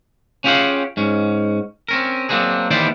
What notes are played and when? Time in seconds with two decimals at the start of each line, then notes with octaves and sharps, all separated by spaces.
0.44 C#4 F4 G4 G#4 F5 F#5
0.97 G#2 C#4
1.89 C4 C#4 A#4
2.29 F#3 A#3 C4 D4 G#4
2.71 D#2 E3 G3 B3 C5 D5